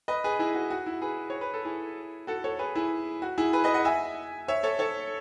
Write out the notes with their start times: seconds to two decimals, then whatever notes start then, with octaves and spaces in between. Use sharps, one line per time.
0.08 B4 D#5
0.24 G#4 B4
0.39 E4 G#4
0.55 F#4
0.70 F#4
0.86 E4
1.02 G#4 B4
1.30 C#5
1.41 B4
1.54 A4
1.65 E4 G#4
2.27 F#4 A4
2.44 A4 C#5
2.59 G#4 B4
2.75 E4 G#4
3.22 F#4
3.38 E4 G#4
3.53 G#4 B4
3.64 B4 D#5
3.74 D#5 F#5
3.85 E5 G#5
4.48 C#5 E5
4.63 A4 C#5
4.79 A4 C#5